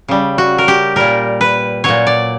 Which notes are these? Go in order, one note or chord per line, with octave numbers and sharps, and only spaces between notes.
C#3 G3
F#4
A#4
G4
A#2 G3 A#4
B4
A#2 F#3 C#5
D5